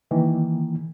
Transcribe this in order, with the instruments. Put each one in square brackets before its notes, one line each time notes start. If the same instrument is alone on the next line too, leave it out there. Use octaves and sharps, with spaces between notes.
[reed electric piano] D#3 E3 A#3